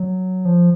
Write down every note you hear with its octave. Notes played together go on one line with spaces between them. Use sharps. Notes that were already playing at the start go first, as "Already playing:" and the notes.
Already playing: F#3
F3